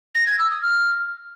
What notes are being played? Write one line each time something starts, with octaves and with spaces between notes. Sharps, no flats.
A#6
G#6
E6
D#6
F6